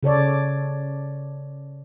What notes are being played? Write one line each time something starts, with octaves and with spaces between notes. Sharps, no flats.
C#3 A4 C#5 D5